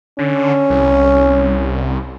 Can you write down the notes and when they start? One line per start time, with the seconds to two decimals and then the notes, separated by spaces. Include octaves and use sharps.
0.19 D3 C#4
0.70 C2